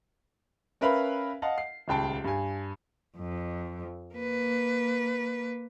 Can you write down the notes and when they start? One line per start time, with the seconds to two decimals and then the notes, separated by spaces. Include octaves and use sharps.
0.81 C#4 A#4 B4 E5 F5 B5
1.42 D#5 F5 F#5 A5
1.58 C7
1.88 D#1 C#2 G5 A5
2.24 G2 G#5
3.17 F2
4.15 A#3 B4